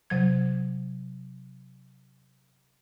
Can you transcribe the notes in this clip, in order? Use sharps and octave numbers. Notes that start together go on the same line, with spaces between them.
C3 F#3 G#6